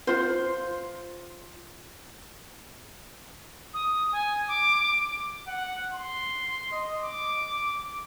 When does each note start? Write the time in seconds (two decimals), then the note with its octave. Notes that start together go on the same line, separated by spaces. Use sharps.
0.07 F4 C5
3.74 D#6
4.12 G#5
4.48 D6
5.47 F#5
5.92 C6
6.72 D#5
7.03 D6